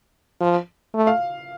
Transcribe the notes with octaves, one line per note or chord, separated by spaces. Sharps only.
F3
A3
F5